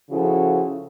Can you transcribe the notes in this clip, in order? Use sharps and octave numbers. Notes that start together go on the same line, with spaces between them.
C#3 F3 E4 F#4 A4